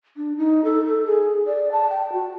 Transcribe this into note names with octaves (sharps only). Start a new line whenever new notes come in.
D4
D#4
A4
A4
G#4
D5
A5
G5
F#4